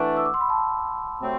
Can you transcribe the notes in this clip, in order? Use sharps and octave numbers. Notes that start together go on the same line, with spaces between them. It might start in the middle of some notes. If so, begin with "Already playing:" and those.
Already playing: E3 A3 D4 F#5
E6
D6
C6
B5
A5
C3 F#3 A3 C4